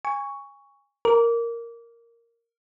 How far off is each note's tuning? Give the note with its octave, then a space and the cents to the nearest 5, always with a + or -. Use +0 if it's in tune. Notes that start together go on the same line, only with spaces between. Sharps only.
G#5 -25 C#6 +10
A#4 -5 D6 -25